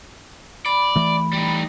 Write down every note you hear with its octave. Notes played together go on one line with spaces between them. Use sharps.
D5 B5
E3 A3
G3 D#4